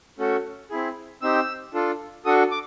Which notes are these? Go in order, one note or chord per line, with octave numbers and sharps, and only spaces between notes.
A3 C#4 F#4 A4
C4 E4 G#4
C4 D#4 G4 E6
D4 F4 A4
D4 F#4 A4 D#6
D6